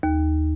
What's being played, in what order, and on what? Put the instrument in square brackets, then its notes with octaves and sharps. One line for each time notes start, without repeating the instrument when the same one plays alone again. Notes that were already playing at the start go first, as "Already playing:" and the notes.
[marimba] D#2